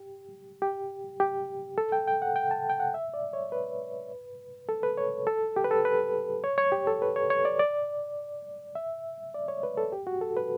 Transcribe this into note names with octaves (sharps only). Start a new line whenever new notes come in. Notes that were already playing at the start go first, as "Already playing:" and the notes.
Already playing: G4
G4
G4
A4
G5
G5
F#5
G5
A5
G5
F#5
E5
D5
C#5
B4
A4
B4
C#5
A4
G4
B4
A4
B4
C#5
C#5
G4
A4
B4
C#5
C#5
D5
D5
E5
D5
C#5
B4
A4
G4
F#4
A4
B4